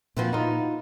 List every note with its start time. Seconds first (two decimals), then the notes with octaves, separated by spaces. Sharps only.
0.17 A#2 F3 C4 E4 F#4 B4
0.33 D#4 F4